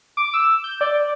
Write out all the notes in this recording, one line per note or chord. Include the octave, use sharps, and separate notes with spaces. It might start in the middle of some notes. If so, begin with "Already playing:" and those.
D6
E6
G6
D5